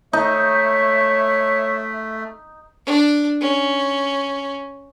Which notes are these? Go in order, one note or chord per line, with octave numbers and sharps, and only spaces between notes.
A3 D#4 C#5 E5
D4
C#4